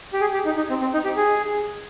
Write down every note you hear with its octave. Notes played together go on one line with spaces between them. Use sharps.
G4
G#4
G4
D#4
D#4
C4
C4
D#4
G4
G#4